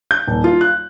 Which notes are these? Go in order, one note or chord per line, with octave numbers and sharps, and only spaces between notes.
G6
D#1
F4
F#6